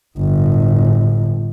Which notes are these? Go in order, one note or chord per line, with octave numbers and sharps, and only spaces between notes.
G1 A2